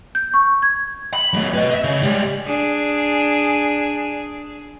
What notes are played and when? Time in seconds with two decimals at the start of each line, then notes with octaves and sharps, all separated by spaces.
0.15 G6
0.34 C#6
0.62 G#6
1.13 B5
1.33 F#3 A3
1.54 B4 D#5
1.71 D#5 E5
1.84 C#3
2.03 G3 G#3
2.47 D4 G#4